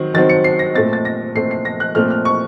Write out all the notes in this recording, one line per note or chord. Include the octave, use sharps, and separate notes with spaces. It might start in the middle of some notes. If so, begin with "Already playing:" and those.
Already playing: D#3 F#3 C4
D#3 F#3 C4 A6
C#7
C7
A#6
A#2 A3 C4 A6
A6
A#6
A#2 A3 C4 C7
C7
A#6
F#6
A#2 A3 C4 F6
F6
C#6